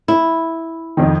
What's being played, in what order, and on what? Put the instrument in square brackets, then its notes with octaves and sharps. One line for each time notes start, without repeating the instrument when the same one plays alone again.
[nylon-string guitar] E4
[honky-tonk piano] F2 D#3